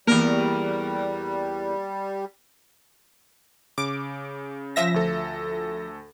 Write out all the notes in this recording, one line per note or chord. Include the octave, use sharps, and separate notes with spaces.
E2 G3 A#3 B3 G4 A#4
C#3 D6
F3 E5 A#6
D2 A4